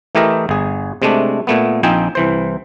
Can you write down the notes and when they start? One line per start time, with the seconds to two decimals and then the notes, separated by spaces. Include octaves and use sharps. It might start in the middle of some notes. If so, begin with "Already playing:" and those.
0.15 E3 A3 E4 G4 A#4 D#5
0.49 G1 G#4
1.02 C3 G#3 A3 D4
1.47 A#2 A3 B3
1.83 A#1 F3 C4 D#4 G5 G#5
2.15 C2 E3 C5